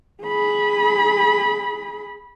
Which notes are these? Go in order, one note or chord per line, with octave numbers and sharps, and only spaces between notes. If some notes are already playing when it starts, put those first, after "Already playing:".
G#4 B5